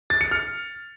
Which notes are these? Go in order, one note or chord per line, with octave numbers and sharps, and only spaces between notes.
A6
C#7
F6